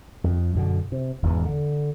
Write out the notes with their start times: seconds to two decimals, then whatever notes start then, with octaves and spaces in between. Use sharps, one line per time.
0.24 F2
0.55 F#2 B2 D3
0.92 C3
1.23 E1 E2 G#2 E3
1.45 D3